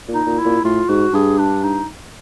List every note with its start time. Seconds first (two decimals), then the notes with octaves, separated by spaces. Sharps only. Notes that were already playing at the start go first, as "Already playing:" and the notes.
0.08 A#2
0.14 D#4
0.27 A#2
0.39 E4
0.46 A#2
0.64 A2 F4
0.89 G#2 F#4
1.14 G2 G#4
1.39 D4
1.63 D#4